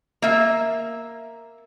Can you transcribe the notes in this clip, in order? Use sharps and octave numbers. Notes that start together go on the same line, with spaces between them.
A#3 E5